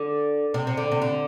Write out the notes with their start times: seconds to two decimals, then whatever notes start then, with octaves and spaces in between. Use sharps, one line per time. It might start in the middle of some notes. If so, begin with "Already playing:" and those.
Already playing: D3
0.54 C3
0.67 C3
0.77 D3
0.92 C3
1.02 D3